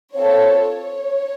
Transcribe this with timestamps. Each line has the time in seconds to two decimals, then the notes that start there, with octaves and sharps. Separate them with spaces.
0.15 C4 F4 A4 C#5
0.70 C#5